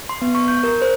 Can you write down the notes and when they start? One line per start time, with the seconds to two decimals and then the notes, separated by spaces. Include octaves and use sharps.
0.09 C6
0.22 B3
0.35 C#6
0.48 G6
0.63 A#4
0.82 C5